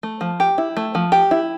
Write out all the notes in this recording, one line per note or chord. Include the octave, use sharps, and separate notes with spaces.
A3
F3
G4
E4
A3
F3
G4
E4